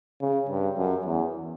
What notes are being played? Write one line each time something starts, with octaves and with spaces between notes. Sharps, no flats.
C#3
G2
F#2
E2